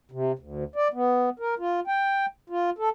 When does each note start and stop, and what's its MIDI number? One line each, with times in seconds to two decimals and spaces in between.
0.12 0.32 48
0.39 0.64 38
0.76 0.88 74
0.94 1.30 59
1.39 1.54 70
1.59 1.80 65
1.87 2.26 79
2.50 2.70 65
2.78 2.89 69